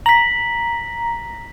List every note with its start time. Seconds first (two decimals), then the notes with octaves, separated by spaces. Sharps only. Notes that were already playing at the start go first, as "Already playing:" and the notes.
0.06 A#5 B6 F#7